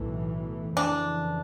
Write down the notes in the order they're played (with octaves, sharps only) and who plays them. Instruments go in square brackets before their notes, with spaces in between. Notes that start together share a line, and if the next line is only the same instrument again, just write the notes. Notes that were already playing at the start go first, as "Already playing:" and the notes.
Already playing: [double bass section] B1 A2 E3 A3
[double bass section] F2 C#3 E3 [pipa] D4